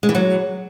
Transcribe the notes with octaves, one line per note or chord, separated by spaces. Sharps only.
G#3
E3
F#3